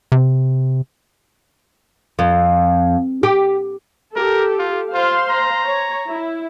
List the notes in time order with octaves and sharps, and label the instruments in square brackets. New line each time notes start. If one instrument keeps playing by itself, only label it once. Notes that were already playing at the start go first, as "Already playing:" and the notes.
[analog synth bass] C3
[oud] F2
G4
[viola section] G4 A4 [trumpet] A#4
[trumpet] F4
[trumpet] F4 [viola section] C5 F5 C6
[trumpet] A#5
[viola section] C#5
E4